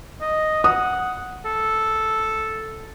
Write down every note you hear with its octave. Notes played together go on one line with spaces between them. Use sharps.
D#5
F#5 D#6
A4